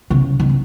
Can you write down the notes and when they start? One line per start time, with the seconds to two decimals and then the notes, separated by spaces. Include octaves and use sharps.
0.10 C#3
0.40 D#3
0.49 C#3